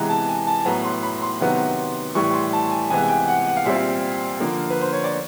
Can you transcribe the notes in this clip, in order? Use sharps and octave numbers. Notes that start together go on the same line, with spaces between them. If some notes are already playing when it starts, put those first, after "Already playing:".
Already playing: C3 E3 G#3 B3 A#5
A5
G#5
A5
A2 F#3 B3 A#5
C6
B5
C6
C3 D#3 F#3 B3
A2 E3 G3 C#6
C6
A5
G#5
C3 E3 G#3 B3 G#5
G#5
G5
F#5
F#5
F5
A#2 G3 C4 E5
F5
D3 F3 A#3
B4
C5
C#5
D5